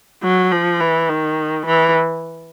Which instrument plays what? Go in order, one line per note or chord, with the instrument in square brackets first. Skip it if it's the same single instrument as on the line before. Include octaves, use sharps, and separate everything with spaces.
[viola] F#3
F3
E3
D#3
E3